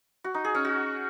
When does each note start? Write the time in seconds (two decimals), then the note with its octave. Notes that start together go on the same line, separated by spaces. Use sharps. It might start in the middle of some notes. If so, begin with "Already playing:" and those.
0.24 F#4
0.34 D#4
0.45 G#4
0.55 C#4
0.65 F#4